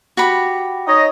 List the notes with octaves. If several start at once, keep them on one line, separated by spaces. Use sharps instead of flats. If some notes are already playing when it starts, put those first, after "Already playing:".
F#4 G4 B5
D#4 C#5 D#5